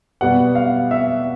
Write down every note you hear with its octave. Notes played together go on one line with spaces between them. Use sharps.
B2 G3 B3 F#5
F5
E5